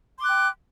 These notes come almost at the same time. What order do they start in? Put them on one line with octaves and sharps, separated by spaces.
C6 D6 F#6 G5